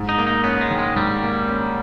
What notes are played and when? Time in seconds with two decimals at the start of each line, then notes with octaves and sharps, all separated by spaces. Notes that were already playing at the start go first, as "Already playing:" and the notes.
Already playing: G#2
0.09 D#4
0.18 A#3
0.27 D#4
0.44 B3 C#4
0.61 G#3
0.71 D#3
0.79 G#3
0.96 G#2 G3
1.23 A#3
1.48 C#4